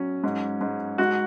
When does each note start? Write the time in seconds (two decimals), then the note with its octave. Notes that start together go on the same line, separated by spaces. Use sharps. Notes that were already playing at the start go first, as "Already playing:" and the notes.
Already playing: F#3 C#4
0.24 G#2
0.61 G#2
0.98 G#2 F#4